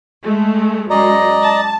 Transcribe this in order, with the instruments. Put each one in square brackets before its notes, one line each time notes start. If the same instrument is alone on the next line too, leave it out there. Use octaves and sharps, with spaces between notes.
[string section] G#3 A3
[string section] F#2 G#3 [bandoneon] D5 D#5 A#5
[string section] A5